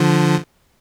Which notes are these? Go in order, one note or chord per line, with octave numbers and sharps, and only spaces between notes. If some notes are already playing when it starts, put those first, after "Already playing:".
Already playing: D3 F3